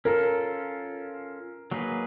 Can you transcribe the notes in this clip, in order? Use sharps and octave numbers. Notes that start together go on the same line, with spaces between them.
C#4 F4 A4 A#4
F#3 A#3 D#4 G#4 B4